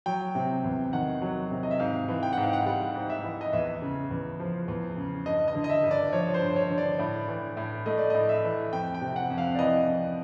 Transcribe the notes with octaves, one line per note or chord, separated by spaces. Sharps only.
F#3 G5
C3
E2
D#3 F#5
F#3
C3
D#5
E5
G#2 F5
E3
G5
G#2 F#5
F5
F#5
G3 F#5
G#2
E5
E3
D#5
E2 E5
C#3
E2
F3
E2
C#3
G2 D#5
D#5
D3
D#5
E5
G2
D5
F3 C#5
C5
G2
C#5
D3
D5
A2
E3
A2
A3 D#5
D5
A2 D#5
E5
E3
F2 G5
G5
C3
F#5
F2
F5
D5
E3 D#5
F2